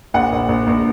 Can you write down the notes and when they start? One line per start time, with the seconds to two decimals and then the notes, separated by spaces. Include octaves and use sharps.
0.14 A#1 F#5
0.32 A#1
0.49 A#1
0.67 A#1